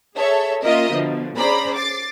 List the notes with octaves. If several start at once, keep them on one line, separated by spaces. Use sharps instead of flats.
G#4 A4 C#5 E5
A#3 C#4 F4 A#4 D#5 E5
B2 D3 F3
C#4 G#4 C5 D5 A#5 B5
D6 A6 C7